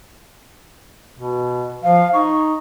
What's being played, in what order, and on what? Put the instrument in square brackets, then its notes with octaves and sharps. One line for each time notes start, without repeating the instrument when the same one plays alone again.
[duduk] B2
[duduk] F3 [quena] F5
[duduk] D#4 [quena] C#6